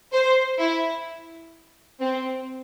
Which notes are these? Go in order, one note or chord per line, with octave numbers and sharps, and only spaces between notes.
C5
E4
C4